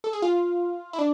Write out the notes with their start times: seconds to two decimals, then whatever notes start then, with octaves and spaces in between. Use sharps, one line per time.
0.04 A4
0.13 G#4
0.22 F4
0.93 E4
0.99 D4